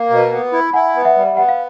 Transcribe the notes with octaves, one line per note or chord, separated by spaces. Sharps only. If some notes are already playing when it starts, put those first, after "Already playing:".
Already playing: A#3
B2
B3
E4
E4 F#5 G#5
B3
E5 F#5
G3
B3 F#5
F5